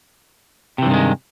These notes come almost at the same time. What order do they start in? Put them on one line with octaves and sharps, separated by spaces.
C3 E3 G2 D#3 G#3